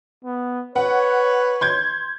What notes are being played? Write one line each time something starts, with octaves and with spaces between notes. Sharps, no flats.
B3
B4 C#5 F#5
C6 G6 G#6